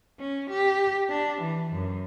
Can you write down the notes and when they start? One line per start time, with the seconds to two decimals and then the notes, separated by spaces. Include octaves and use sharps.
0.20 C#4
0.51 G4
1.10 D4
1.42 E3
1.72 F#2